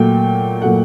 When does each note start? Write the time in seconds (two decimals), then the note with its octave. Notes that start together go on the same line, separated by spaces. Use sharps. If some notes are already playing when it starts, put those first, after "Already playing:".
Already playing: A#2 F#3 A3 G5
0.61 A#2 F#3 A3 F#5